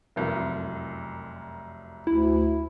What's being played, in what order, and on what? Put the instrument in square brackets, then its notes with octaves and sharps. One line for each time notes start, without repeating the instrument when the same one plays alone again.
[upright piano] F1 C2 F#2
[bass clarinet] D2 [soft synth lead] E4